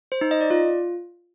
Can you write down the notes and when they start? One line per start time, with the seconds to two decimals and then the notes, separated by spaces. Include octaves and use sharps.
0.12 C5
0.21 D#4
0.31 D#5
0.41 D5
0.50 F4